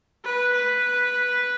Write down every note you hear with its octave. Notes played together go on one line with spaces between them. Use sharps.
B4
B4